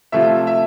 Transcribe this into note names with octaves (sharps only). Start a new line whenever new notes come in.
C3 F3 A3 E4 E5
E5